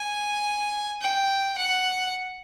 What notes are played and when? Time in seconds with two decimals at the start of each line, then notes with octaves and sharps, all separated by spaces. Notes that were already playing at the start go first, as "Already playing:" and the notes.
Already playing: G#5
1.01 G5
1.58 F#5